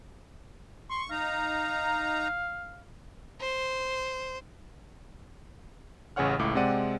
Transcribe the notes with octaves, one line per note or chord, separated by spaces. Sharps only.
C6 C#6
D#4 F5 A#5
C5
A1 C#3 G#4 C#5 F#5 F6
C#2 A2 D6
C3 G#3 C4 D5 F#5 D#7